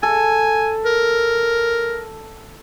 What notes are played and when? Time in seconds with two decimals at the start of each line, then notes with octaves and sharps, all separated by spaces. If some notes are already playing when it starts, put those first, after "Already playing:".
0.03 A4 G#5
0.85 A#4